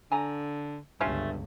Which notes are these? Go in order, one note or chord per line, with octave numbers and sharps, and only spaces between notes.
D3 G#5 A#5
G1 C#2 G2 A3 C#4 F4